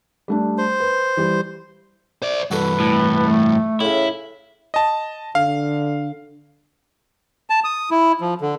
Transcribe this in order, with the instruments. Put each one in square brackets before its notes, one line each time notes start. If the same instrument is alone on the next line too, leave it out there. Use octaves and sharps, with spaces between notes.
[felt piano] G3 A3 D4
[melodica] C5
[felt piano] B4
E3 G3
[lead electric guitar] C5 D5
[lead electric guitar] G2 E3 [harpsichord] F#4 A4 [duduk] B4
[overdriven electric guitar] A2
[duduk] A3
[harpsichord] A2 C#3 [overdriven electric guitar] E4
[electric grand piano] D#5 A5
[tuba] D3 [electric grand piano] F5
[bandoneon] A5
D#6
E4
F3
D3